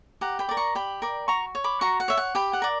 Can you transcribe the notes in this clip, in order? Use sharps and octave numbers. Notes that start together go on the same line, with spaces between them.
G4 F#5 A#5
G5 B5
A#4 D5
A#5 C#6
G4 G5 B5
A#4 D5
F#4 A#5 C#6
C#5
B5 D6
F#4 A#5 C#6
F#5
C#5 E5
F#5
G4 G5 B5
F#5
A#4 D5